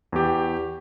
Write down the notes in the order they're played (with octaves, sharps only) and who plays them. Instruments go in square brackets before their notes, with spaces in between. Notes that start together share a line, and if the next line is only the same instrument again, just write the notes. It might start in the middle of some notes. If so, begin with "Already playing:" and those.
[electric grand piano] E2 G4